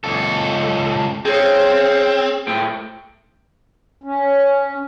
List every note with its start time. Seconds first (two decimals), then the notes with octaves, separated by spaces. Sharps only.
0.04 C#2 A4
1.25 C4 G#4 C#5
2.47 A2 C5 G5
4.04 C#4